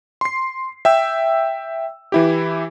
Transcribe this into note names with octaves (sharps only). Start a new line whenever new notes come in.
C6 C7
E5 G5 E6
E3 E4 G4